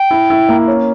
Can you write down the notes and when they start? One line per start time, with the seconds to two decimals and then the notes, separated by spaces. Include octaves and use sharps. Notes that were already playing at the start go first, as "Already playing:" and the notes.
Already playing: G5
0.11 E4
0.30 E4
0.49 A#3
0.68 C#4